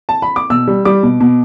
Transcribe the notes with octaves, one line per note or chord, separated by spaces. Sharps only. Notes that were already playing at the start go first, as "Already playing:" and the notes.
A5
B5
D6
B2 E6
G3
G3 D6
B2
B2